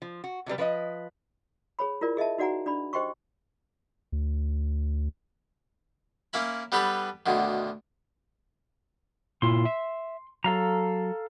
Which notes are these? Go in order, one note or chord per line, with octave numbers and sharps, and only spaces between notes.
F3
F#4
C3 F#3 G3 B4
F3 B4 C5 D#5
G#4 C#5 B5
E4 F4 A#4 D5
G#4 D#5 E5 A5
D#4 F#4 D5 F#5 G#5 A#5
D4 D5 B5
G4 C5 D#5 G5 C6 C#6
D2
A#3 C#4 E4 B5
G3 B3 D4 G4 A4 B4
D2 B2 D3 D#3
A#2 E4 F4 C6
E5
F#3 A4 F5 A#5